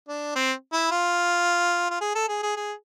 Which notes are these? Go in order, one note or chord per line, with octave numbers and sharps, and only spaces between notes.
D4
C4
E4
F4
F4
G#4
A4
G#4
G#4
G#4